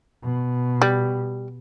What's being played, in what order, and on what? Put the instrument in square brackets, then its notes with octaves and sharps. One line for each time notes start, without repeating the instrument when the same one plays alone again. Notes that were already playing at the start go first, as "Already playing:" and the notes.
[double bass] B2
[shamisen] G3